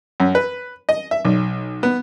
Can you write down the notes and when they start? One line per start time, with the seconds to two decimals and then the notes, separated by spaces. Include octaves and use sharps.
0.20 F#2
0.35 B4
0.89 D#5
1.11 E5
1.25 B1
1.83 B3